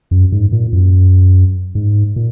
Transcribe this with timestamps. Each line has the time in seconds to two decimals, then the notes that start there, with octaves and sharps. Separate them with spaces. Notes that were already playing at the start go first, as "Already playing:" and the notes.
0.11 F#2
0.32 G#2
0.52 A#2
0.73 F#2
1.75 G#2
2.16 A#2